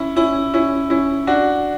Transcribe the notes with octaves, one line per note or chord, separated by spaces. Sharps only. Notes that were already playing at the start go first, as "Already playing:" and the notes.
Already playing: C#4 E4
C#4 E4
C#4 E4
C#4 E4
D4 F#4